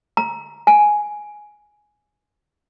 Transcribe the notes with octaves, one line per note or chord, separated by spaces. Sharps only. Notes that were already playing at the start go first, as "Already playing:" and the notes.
A#5
G#5